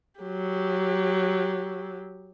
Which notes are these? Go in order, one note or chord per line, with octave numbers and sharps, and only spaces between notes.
F#3 G4